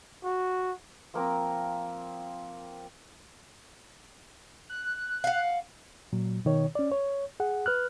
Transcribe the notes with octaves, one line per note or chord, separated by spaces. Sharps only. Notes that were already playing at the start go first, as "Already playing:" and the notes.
F#4
F3 A#3 C4 A#4
F#6
F5 F#5
A#2 F#3
B2 D#3 C#5
C#4 D5
C#5
G#4 F#5
B4 F6 F#6